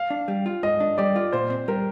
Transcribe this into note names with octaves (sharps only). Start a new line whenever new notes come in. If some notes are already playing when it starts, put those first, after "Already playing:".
Already playing: F5
D4
G3
F4
G#2 D#5
D4
G3 D5
F4
A#2 C5
C4
G3 A#4